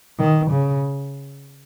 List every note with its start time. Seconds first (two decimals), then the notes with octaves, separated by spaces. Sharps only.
0.19 D#3
0.51 C#3